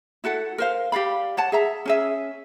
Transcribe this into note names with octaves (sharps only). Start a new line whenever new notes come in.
E4 F#4 A4 F#5
A#4 C5 F5
G4 D5 F5 B5
C#5 F#5 A5
G#4 E5 A#5
C#4 G#4 E5